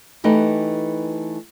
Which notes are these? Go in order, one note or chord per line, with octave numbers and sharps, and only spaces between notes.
E3 A3 D#4 G4 B4